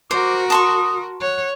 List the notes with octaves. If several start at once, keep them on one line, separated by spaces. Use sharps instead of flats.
F#4 A#4 C5 D6
A5 C6 C#6 D#6
C#5 F#5